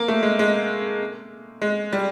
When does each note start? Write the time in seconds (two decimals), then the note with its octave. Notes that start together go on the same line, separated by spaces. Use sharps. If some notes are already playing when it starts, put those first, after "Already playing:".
Already playing: A#3
0.08 A3
0.23 G#3
0.39 G#3
1.62 G#3
1.93 G3